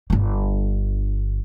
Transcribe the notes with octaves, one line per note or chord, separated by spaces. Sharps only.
G1 D3